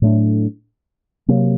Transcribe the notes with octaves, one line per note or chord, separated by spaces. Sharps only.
A2 F#3 A3 D4
C3 F#3 A#3